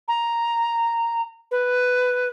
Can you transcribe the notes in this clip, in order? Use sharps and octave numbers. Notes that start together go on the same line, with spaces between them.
A#5
B4